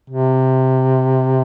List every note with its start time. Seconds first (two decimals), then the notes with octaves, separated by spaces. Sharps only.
0.10 C3